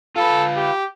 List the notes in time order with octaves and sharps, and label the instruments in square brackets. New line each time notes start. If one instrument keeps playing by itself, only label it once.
[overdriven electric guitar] F4 B4 [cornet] A4
[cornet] G4